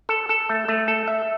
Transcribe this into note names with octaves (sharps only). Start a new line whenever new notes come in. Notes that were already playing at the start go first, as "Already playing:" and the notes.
A4
A4
A3
A3
A4
E5